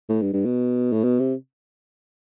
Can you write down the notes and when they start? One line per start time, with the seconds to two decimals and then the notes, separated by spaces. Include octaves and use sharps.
0.09 A2
0.22 G2
0.34 G2
0.45 B2
0.92 A2
1.04 B2
1.20 C3